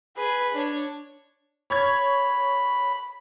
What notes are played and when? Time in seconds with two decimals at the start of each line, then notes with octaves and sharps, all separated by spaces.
0.17 G#4 B4
0.54 D4 C#5
1.70 C#5 B5 C#6 G#6